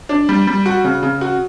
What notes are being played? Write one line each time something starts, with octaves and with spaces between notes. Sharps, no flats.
D4
G3
G3
F#4
C#3
C#3
F#4